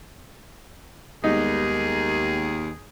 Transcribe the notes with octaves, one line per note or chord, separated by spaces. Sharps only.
D#2 G3 G#3 B3 D#4 G#4